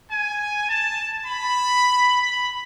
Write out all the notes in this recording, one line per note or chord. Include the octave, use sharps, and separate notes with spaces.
G#5
A5
B5
B5